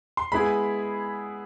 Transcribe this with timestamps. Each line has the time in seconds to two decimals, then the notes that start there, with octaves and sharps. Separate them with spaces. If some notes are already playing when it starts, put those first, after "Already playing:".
0.17 C6
0.32 G#3 B3 E4 G#4 B5